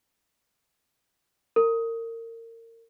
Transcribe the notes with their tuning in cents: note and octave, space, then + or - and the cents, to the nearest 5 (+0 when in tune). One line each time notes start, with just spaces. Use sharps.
A#4 -30